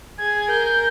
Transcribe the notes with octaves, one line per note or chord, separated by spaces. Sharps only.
G#4 G#6
A#4 G6